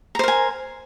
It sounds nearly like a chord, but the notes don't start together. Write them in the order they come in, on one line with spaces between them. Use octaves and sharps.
A#5 C5 A#4 G#5